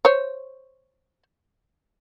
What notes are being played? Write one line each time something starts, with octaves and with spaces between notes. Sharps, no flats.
C5 C#5